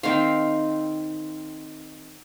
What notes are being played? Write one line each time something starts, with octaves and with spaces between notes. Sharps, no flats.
D#3 C4 F5